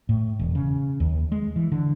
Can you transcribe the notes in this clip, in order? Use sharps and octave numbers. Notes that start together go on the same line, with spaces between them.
A2
E1
C#3
D#2
G#3
E3
D3